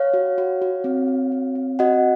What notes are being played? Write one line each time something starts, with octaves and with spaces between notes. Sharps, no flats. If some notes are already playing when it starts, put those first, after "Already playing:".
Already playing: C#5 F5
F#4
F#4
F#4
C4
F#4
C4
C4
F#4 D#5 F#5